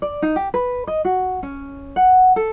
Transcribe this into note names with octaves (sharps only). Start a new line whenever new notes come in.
D5
D#4
G4
B4
D#5
F#4
C#4
F#5
A4